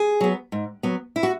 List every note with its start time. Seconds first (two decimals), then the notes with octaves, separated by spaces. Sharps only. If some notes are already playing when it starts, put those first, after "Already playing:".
Already playing: G#4
0.21 F#3 B3
0.52 G#2
0.83 F#3 B3
1.16 E4
1.23 F#4